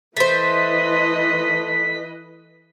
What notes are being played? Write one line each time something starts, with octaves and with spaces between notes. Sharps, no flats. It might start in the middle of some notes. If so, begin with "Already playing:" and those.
E3 A3 B4 C5 D#5 B6